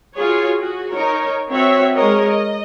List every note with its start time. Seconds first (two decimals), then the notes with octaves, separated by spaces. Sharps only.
0.15 F4 F#4 G#4 C#5
0.58 F#4 G#4
0.91 D#4 A#4 C#5
1.49 C4 F#4 C#5 E5
1.93 G#3 A#4 C#5 D#5
2.26 D#5